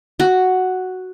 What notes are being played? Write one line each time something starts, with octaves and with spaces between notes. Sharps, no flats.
F#4